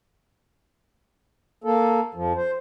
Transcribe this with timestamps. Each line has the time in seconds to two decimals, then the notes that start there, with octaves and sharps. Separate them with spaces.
1.64 A#3 A4
2.14 F2 F3
2.36 C5